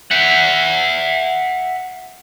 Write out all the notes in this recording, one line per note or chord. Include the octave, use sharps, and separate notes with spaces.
E5 F#5